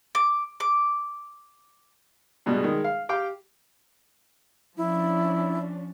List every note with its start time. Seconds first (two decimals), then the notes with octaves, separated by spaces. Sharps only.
0.15 D6
0.60 D6
2.46 G2 B2 G3 G#3
2.64 D#3 G#3
2.84 F5
3.09 G4 F5 G5 D6
4.77 F3 C#4 D4 E4